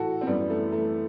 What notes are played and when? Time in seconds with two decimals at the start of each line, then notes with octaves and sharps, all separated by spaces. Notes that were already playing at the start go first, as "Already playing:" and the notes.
Already playing: A2 E3 F#4 A4
0.21 C4
0.27 F#2 E3 G3 B3
0.50 A3
0.73 A3